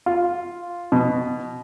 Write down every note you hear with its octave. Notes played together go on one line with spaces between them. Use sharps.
F4
B2